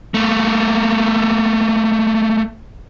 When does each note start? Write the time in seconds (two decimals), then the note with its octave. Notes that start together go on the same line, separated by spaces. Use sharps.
0.14 A3 A#3